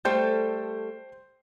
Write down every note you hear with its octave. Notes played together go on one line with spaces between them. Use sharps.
G3 A3 A4 C5 G5 G6